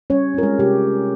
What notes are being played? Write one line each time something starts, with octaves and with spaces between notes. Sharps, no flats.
G3 C#4 C#5
C4 F4 A#4
G#3 G#4
C3 G4